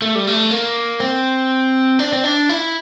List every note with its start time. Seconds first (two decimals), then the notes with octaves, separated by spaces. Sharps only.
0.02 A3
0.15 G3
0.27 A3
0.51 A#3
1.00 C4
1.99 D4
2.13 C4
2.24 D4
2.49 E4